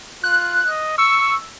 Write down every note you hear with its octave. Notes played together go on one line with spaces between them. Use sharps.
F4 F#6
D#5
C#6 E6